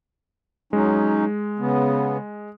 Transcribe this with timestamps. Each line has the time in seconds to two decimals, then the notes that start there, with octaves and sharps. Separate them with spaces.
0.73 F#3 G#3 C#4 D#4
1.59 C#3 B3